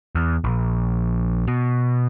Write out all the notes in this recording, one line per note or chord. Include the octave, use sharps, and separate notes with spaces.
E2
A#1
B2